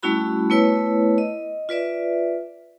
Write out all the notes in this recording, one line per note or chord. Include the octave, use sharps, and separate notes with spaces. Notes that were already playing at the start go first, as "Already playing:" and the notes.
G3 A3 C#4 E4 F#4 B5
A3 B3 E4 B4 C#5 E6
D#5
F4 B4 D5 E5